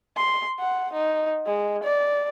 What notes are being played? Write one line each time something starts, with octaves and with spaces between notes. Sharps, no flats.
C6
F#5
D#4
G#3
D5